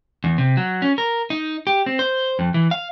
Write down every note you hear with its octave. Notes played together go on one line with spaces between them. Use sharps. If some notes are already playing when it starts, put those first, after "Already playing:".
E2
C3
F#3
C#4
A#4
D#4
G4
C4
C5
F2
E3
F5